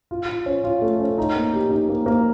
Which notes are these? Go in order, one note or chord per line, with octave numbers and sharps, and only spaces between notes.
F4
F4
C#4
F4
A3
C#4
D#4
A#3
G4
D#4
A#3
A#3